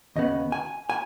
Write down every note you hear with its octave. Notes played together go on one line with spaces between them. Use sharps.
D#2 C#3 B3 D#5
G#5
G#5